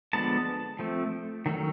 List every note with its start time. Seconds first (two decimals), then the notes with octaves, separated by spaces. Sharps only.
0.13 D3 F3 G#3 B3 A5
0.79 F3 A3 C4
1.46 D#3 F#3 A3 C#4